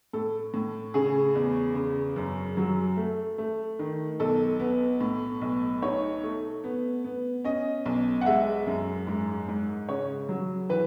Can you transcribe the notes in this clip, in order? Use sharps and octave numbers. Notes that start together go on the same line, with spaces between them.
A2 A4
A2
C#3 G#4
E2
C#3
F#2
F#3
A3
A3
D#3
B1 A4
B3
A2
B1
D#4 C#5
A3
B3
B3
C#4 D#5
B1
F#5
G#3 E5
F#2
G#2
G#2
C#3 C#5
F#3
E3 B4